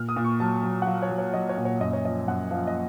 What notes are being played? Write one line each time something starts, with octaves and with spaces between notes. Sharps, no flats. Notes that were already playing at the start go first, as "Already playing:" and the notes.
Already playing: A#2 F6
D#6
A#2
C#6
F#3 A5
F#3
F#5
F#3 F5
C#5
F#3
C#5
F#3 D#5
C#5
A#2
C#5
F#2 D#5
C#5
F3 D#5
F#2 F#5
F3 F5
D#5